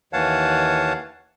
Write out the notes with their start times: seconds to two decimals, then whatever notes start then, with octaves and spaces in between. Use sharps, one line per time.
0.13 D#2 E3 C#5 F5 F#5 A5